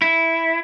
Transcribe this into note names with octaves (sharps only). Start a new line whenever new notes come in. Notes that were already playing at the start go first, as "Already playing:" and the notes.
E4